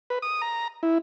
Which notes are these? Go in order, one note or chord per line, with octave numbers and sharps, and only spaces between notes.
B4
D#6
A#5
E4